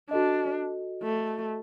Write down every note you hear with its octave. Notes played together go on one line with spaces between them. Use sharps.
D4 F#4 A4 D#5
A3